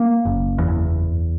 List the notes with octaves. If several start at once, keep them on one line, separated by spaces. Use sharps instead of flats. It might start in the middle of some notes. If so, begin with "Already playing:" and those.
Already playing: A#3
F#1
E2